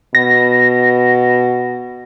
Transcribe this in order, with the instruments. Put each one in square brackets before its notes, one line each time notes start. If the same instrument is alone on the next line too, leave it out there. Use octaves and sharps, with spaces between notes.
[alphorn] B2 [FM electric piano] A#6